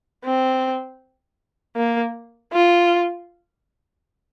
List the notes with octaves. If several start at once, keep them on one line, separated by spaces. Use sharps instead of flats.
C4
A#3
F4